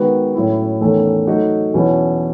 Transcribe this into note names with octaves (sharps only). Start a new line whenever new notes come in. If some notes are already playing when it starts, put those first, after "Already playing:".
Already playing: D#3 G#3 B3 F#4 B4
A2 F#3 C#4 E4
E2 D#3 A3 C#4
F#3 A3 D#4 F#4
E2 B2 F#3 C#4 E4